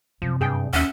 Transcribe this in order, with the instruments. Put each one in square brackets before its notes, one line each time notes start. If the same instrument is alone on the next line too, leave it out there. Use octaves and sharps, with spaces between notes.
[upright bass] F#2 C3 [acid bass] F3
[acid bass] G2 [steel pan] G#4 G5
[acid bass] D#2 [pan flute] C#4 [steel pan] E5 F#5